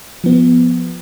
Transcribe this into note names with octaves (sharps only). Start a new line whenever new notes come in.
F3 B3